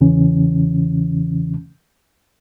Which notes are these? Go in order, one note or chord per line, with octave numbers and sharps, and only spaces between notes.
E2 C#3 E3 C#4